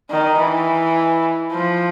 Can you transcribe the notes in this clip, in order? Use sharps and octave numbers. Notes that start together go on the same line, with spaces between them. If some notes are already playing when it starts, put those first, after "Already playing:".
D#3
E3
F3